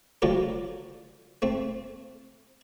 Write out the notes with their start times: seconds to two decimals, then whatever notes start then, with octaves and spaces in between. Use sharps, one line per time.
0.22 D3 F3 F#3 A3 G4
1.42 A3 C4